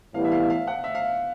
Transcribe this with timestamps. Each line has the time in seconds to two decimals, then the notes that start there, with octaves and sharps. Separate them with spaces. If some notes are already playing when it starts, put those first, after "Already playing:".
0.14 A2 E3 G3 B3 F5
0.25 E5
0.32 F5
0.42 E5
0.50 F5
0.67 F#5
0.84 E5
0.95 F5